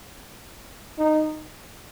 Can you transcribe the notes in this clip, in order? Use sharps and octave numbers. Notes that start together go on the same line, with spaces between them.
D#4